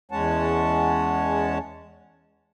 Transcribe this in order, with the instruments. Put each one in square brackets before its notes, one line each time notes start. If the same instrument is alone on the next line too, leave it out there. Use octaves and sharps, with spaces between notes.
[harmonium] E2 G#3 C#4 C#5 F#5 A5